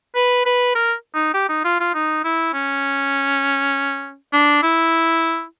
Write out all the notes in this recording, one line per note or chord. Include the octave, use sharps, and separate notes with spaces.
B4
B4
A#4
D#4
G4
D#4
F4
F4
D#4
E4
C#4
D4
E4